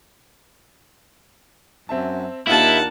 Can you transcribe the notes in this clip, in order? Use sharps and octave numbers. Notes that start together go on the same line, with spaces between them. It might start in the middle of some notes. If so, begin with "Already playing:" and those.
F#2 C4 E5 A5
D#2 A#3 D4 E4 F4 F#5 A5